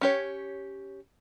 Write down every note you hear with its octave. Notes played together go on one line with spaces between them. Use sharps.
C#4 G4 C#5